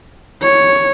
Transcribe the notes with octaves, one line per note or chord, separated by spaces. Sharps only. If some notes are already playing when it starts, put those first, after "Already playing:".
C#5